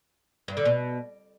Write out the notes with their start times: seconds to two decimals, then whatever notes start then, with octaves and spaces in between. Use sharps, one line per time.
0.48 G2
0.57 D3
0.65 B2